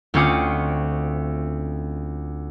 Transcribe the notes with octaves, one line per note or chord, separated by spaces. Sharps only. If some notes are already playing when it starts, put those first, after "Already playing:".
D2 C4 C#4 F4 D6 D#6